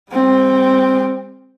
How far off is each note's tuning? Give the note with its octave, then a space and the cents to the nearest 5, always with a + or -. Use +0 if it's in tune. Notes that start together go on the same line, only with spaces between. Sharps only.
G3 +40 C4 +0